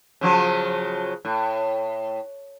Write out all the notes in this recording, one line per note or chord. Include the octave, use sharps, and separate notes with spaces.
C#3 F3 F#3
A2